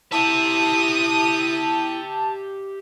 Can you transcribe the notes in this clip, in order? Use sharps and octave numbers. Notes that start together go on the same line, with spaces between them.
E4 G4 E5 A5 D#6